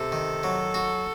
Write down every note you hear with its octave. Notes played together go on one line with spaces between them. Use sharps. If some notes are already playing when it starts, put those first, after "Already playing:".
Already playing: C3 A4
D#3
F#3
F#4